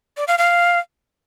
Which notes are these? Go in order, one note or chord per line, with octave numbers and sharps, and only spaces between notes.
D5
F5
F5